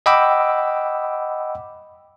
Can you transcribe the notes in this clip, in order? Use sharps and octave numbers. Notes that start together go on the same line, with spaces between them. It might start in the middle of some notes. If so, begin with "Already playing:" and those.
D#5 F#5 G5 B5 D6 E6